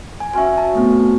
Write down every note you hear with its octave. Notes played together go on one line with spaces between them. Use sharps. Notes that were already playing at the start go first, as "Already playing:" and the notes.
G#5
C#4 F#4 C#5 E5 G#5
A5
A3 B3 C4